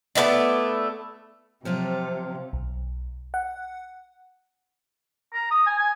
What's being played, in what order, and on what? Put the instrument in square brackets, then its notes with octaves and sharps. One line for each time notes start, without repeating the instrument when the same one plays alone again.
[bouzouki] A3 B3 E4 D5
[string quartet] C3 [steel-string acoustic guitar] F3 F#3 F4
[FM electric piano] B1
F#5
[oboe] A#5
D#6
G#5
G#5